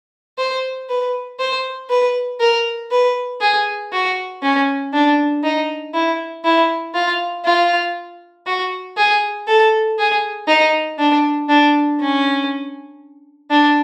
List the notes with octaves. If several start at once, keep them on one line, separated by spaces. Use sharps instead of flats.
C5
B4
C5
B4
A#4
B4
G#4
F#4
C#4
D4
D#4
E4
E4
F4
F4
F#4
G#4
A4
G#4
D#4
D4
D4
C#4
D4